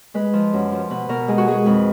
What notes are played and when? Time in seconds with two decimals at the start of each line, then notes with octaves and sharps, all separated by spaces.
0.14 G#3 B4
0.33 F3
0.53 F#2
0.72 F3
0.90 B2 B4
1.09 B2 A#4
1.28 G#3 G#4
1.38 F#4
1.47 G#3 G#4
1.66 F2 B4